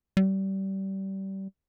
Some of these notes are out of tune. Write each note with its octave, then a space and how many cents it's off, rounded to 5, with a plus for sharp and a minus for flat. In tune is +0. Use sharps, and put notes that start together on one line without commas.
G3 -25